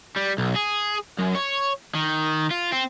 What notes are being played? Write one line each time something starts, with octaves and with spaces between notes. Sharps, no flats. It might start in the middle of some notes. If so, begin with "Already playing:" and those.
G3
B1
G#4
F#2
C#5
D#3
F4
C4